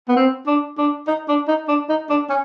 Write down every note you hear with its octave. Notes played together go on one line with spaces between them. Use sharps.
B3
C4
D4
D4
D#4
D4
D#4
D4
D#4
D4
C#4